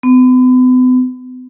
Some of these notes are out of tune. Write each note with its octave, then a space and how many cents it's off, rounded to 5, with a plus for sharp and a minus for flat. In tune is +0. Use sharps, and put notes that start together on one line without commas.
B3 +45